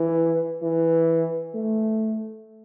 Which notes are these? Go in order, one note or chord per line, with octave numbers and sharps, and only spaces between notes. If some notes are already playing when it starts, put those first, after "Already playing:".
Already playing: E3
E3
A3